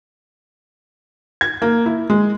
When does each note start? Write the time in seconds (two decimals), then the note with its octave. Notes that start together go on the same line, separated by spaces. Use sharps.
1.41 G#6
1.62 A#3
1.86 E4
2.10 G#3